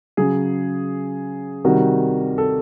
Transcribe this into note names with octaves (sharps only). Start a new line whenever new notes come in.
C#3 F#3 G#4
C3 D#3 G3 F#4
A4